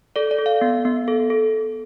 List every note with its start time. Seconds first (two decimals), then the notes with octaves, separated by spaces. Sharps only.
0.16 A4 D5
0.31 D5
0.39 A4
0.46 F5
0.61 B3
0.85 B3
1.08 A4
1.30 A4